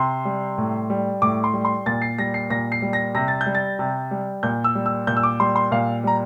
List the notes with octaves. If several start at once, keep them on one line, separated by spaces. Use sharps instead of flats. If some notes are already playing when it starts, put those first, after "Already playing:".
Already playing: C3 C6
G3
A2
G3
A2 D6
C6
G3
C6
A#2 A6
C7
G3 A#6
C7
A#2 A#6
C7
G3
A#6
C3 A#6
A6
G6
G3
A6
C3
G3
A#2 G6
E6
G3
E6
A#2 G6
E6
D6
G3 C6
C6
A#2 F5
G3 A#5